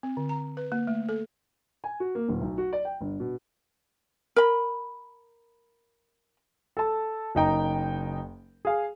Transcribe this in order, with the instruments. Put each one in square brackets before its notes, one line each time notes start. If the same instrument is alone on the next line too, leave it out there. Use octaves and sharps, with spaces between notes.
[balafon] C4
D3
A#5
B4
A#3
A3
A4
[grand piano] G#5
F#4
A#3
D1
B1
F#4
D5
G5
G1
B2
[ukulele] A#4 B5
[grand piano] A4 A5
F#1 D#4 G5 A#5
G#4 F5 G#5